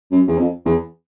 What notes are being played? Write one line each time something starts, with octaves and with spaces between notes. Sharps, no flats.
F#2
E2
F2
E2